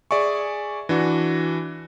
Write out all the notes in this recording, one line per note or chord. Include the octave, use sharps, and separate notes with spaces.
G#4 D5 E5 G#5 C#6
E3 D4 F#4